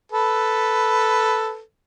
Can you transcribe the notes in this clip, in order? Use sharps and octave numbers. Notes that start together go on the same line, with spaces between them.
A4 B4